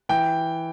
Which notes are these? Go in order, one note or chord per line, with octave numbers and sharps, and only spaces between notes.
E3 G5